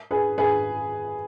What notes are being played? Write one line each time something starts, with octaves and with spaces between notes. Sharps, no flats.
G#4 B4
G#4 B4